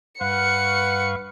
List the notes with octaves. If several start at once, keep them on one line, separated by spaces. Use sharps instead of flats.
G2 B4 F5 F#5 C#6 C#7